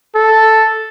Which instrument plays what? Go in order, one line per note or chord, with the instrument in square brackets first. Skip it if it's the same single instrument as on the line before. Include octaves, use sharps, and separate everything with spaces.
[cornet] A4